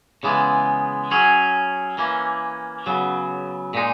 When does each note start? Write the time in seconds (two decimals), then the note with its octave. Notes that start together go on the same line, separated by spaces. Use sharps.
0.23 C#3 E3 G#3 B3
1.11 F#3 C#4 G#4
1.98 E3 A#3 C#4
2.86 C#3 F#3 B3
3.74 A#2 G#3 D#4